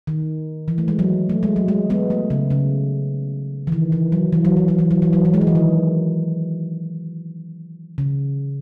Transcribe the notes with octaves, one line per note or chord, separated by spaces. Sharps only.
D#3
E3
A3
G#3
F#3
A3
G#3
F#3
G#3
G#3 B3
A3
C#3
C#3
E3
D#3
E3
F#3
E3
F#3
E3
F#3
E3
F#3
E3
F#3
E3
G#3
F#3
E3
D#3
C#3